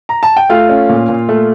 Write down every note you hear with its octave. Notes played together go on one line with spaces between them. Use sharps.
A#5
A5
G5
A3 F4 F5
C#4
A#2
A#2
A3